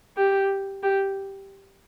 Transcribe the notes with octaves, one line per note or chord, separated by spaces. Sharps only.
G4
G4